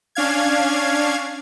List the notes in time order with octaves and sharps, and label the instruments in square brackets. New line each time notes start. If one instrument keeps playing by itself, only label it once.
[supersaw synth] C#4 D4 F5 G#6